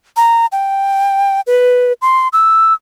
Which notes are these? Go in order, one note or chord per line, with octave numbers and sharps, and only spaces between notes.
A#5
G5
B4
C6
E6